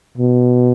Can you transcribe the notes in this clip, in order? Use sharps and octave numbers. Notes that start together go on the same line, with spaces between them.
B2